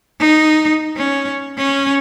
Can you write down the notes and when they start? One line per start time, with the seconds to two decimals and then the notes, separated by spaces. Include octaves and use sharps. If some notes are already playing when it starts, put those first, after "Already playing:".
0.20 D#4
0.96 C#4
1.58 C#4